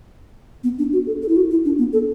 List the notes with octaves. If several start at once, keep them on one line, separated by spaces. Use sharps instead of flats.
B3
D4
F#4
A4
A4
E4
F#4
E4
D4
B3
A4